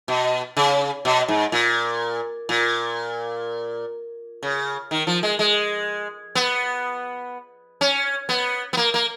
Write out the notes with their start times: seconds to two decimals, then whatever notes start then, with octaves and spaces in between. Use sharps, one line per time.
0.08 B2
0.57 C#3
1.05 B2
1.28 G#2
1.52 A#2
2.49 A#2
4.43 C#3
4.91 D#3
5.07 F3
5.23 G#3
5.39 G#3
6.35 B3
7.81 C#4
8.29 B3
8.73 B3
8.77 A#3
8.94 A#3